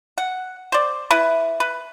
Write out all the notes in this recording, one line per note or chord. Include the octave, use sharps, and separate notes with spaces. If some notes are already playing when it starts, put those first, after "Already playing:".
F#5
C5 D5
E4 B4
B4